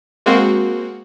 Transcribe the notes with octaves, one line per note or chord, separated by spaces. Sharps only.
G#3 A#3 C4 F#4